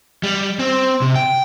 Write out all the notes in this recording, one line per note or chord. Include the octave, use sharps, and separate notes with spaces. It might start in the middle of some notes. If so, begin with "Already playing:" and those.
G3
C4
C3
G5